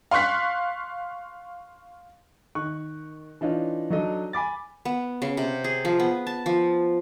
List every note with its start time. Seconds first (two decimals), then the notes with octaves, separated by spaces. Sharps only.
0.11 F5 C6 C#6 F#6 B6
2.55 D#3 C#6 F#6
3.41 E3 D4 D#4 F4 C#5
3.90 F#3 D4 D#4 A4 D#5
4.33 G#5 B5 D6 A6
4.85 B3
5.22 C#3
5.37 C3
5.64 G#4
5.85 F3
6.00 B3
6.27 A5
6.46 F3